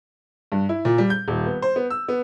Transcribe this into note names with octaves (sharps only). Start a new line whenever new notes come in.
G2
E4
A#2
G3
G6
D#1
B3
C5
B3
E6
B3